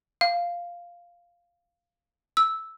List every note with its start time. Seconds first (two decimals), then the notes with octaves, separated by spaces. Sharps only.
0.21 F5
2.37 E6